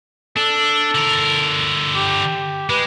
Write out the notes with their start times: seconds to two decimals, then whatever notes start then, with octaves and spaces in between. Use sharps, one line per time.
0.37 D4 A4
0.95 D3 A#4
1.96 G4
2.70 G#3 B4